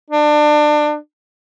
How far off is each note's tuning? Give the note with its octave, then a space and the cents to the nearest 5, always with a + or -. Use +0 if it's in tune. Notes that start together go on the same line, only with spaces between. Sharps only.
D4 +25